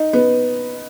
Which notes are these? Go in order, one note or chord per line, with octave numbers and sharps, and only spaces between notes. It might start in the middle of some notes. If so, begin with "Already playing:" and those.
Already playing: D#4
B3